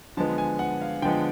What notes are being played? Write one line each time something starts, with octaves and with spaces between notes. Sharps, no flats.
D3 F3 G#3 B3 A5
G#5
F#5
F5
D3 F3 G#3 B3 G5